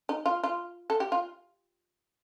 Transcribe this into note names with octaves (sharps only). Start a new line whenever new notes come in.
D#4
F4
F4
A4
G4
F4